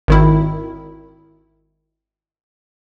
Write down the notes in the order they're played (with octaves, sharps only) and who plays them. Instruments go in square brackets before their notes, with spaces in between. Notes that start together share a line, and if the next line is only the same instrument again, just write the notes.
[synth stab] G#1 D#3 E4